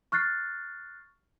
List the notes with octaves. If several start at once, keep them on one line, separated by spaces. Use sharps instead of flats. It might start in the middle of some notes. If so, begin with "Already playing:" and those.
C#6 F6 F#6 A6 C7